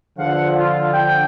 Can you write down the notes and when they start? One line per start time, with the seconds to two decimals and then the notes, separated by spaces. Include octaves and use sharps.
0.18 E2 D3 F3 F5 F#5
0.57 F4
0.93 G5